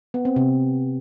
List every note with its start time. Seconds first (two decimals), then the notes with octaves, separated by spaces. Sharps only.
0.14 B3
0.25 C4
0.36 C3